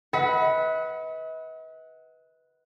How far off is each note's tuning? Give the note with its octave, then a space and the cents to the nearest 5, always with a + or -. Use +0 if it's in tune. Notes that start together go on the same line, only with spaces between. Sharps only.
B4 -5 D#5 +45 F#5 +0